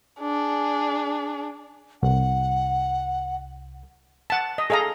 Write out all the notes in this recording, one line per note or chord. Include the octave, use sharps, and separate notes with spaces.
D4 G#4
C2 F#5
F#5 A5
D#5
G#4 A4 D#5 F5 A#5